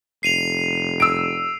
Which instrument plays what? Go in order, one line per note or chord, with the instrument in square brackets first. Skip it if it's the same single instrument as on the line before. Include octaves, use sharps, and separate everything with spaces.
[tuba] F1 [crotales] C7 D#7 F7
[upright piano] E6 D7